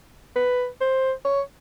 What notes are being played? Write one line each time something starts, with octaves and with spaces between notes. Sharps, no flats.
B4
C5
C#5